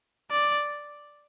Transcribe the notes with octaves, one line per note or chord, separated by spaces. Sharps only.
D5